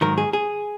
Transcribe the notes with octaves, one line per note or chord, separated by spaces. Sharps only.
G#2 D#3 F#3 A#4
G#4
G#4